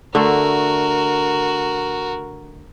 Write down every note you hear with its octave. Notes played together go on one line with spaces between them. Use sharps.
D3 A3 F#4 A#4